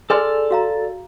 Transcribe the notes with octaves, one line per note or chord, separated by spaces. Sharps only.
G#4 A4 D5 G#5 C6 F6
F#4 F5 A#5